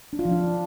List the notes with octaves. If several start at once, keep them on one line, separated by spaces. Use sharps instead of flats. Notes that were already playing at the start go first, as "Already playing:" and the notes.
D4
F4
F3
D4